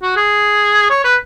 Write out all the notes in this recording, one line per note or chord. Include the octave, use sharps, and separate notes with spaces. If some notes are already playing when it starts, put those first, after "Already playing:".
F#4
G#4
C#5
B4